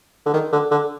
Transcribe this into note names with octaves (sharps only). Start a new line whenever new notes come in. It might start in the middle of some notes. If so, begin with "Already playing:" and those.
D3
D#3
D3
D3